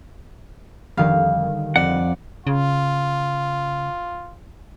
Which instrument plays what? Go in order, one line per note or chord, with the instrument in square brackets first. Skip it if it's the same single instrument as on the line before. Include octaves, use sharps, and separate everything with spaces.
[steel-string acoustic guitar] F2 [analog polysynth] D3 D#3 G3 [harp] F5
[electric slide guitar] F2 F#5 [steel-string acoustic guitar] D5
[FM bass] C#3 [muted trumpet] F4